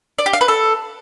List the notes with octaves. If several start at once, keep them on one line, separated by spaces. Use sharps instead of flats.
D5
G4
F5
B4
A4